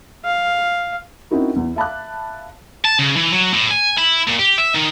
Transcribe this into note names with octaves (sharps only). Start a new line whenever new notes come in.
F5
C4 C#4 D#4 E4 F#4 A#4
E2
E5 F5 A5 B5 D6 F#6
A5
C#3
E3
F#3
A2
G#5
E4
A#2
G4
E5
D#3